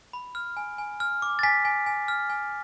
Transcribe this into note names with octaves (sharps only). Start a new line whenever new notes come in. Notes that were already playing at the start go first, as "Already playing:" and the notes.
B5
F6
G#5
G#5
F6
D6
A6
G#5 B6
G#5
G#5
F6
G#5